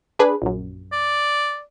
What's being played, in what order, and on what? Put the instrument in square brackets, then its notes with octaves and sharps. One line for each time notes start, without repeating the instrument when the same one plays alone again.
[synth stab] D4 G#4 B4
A#1 F#2
[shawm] D5